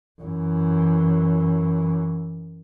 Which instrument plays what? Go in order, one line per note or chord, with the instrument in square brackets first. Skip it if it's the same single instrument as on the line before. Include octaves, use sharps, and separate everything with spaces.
[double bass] F#2 E3